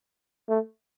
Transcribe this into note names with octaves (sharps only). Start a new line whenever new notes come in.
A3